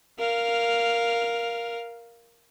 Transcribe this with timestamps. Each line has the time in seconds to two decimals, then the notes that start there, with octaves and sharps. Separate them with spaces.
0.19 A#4 F5